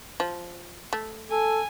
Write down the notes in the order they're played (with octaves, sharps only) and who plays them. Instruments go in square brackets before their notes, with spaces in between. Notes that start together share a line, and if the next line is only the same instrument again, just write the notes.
[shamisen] F3
A3
[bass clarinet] A4 [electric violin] G#5